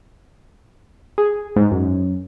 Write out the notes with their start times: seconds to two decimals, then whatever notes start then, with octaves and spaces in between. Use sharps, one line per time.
1.18 G#4
1.56 G#2
1.71 F#2